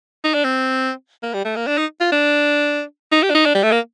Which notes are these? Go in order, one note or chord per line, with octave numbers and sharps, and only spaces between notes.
D#4
D4
C4
A#3
G3
A3
A#3
D4
D#4
F4
D4
D#4
G4
D4
D#4
D4
G3
A3
A#3